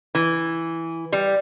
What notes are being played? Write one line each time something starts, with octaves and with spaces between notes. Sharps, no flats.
E3
G3